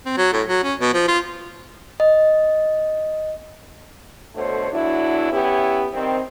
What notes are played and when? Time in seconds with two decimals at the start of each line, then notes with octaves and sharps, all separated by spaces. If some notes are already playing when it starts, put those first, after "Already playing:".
0.06 C4
0.17 F#3
0.33 A2
0.48 F#3
0.63 C#4
0.80 B2
0.93 F3
1.08 F4
2.00 D#5
4.35 B2 D3 A3 C5 C#5
4.71 E2 F#3 D4 E4
5.32 B3 C#4 E4 G4
5.94 D#3 G3 C4